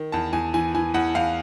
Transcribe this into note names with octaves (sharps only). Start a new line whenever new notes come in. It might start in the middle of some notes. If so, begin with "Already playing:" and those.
Already playing: D#3
E2 A5
E2 G#5
E3 G#5
E3 G#5
E2 F#5
E2 F5